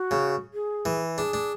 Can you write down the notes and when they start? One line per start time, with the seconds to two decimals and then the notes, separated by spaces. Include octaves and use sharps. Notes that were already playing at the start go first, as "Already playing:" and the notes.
Already playing: F#4
0.11 C#3
0.54 G#4
0.85 E3
1.17 D4 G#4
1.34 D4